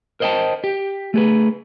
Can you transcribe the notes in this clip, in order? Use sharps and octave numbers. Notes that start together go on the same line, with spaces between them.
A#4 C5 D#5 E5 G5 A5
G4
A3 G#4 B4